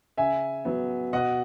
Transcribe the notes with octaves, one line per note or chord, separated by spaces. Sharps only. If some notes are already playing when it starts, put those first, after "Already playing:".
C#3 E5 G#5
F#3 B3
B2 D#5 F#5